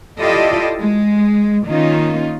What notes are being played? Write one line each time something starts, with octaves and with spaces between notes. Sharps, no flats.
E4 F4 G4 A4 D5 D#5
G#3
D#3 A#3 C#4 D#4 F4